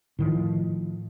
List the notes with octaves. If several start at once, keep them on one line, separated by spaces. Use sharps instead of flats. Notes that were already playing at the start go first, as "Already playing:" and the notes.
A2 D#3 F3